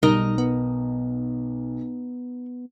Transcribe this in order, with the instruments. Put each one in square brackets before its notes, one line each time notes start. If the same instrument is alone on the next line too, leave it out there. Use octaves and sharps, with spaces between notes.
[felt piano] B1 [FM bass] G3 [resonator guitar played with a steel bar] D#4 A#4 D#5
[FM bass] B3